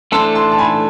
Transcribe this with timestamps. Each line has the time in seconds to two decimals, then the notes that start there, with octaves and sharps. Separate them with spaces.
0.12 E3 A3 D4 A4 C5 A5 C6
0.35 A5 C6
0.52 A5
0.58 G#5 B5